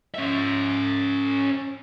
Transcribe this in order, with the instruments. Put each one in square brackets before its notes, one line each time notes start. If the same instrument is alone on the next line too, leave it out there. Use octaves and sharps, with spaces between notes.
[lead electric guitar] C#4 E5